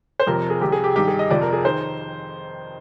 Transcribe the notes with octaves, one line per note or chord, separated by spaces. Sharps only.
C5
F2 C3 F3 A#4
G#4
C2 C3 F3 G4
G#4
G4
G2 D#3 G4
G#4
D#5
F2 C3 F3 D5
A#4
G#4
D#3 C5